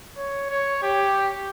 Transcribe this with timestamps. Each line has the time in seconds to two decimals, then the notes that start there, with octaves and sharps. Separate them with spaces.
0.17 C#5
0.49 C#5
0.82 G4